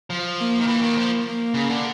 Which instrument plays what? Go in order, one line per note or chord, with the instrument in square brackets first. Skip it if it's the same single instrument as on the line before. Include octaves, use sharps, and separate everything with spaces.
[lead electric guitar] F3
[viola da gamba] A#3
[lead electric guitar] D#3
E3
D#3
F3
[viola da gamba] A#3
[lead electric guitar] C#3
D3